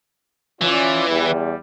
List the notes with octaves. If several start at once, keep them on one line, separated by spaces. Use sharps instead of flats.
E3 C#4 F4 D5
E2 G3